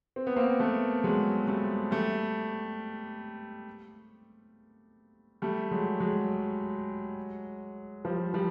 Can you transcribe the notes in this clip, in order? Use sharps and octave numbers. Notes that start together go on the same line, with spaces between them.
C4
B3
A#3 C4
A3 B3
F#3 G#3
G3 A3
G3 A3
G3 A3
F#3 G#3
F#3 G#3
F3 G3
F3 G3